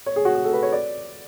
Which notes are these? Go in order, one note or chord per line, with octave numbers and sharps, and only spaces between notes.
C#5
G#4
F#4
G#4
A4
B4
C#5
D5